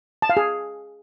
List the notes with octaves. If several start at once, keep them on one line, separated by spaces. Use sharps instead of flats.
A5
F5
G#4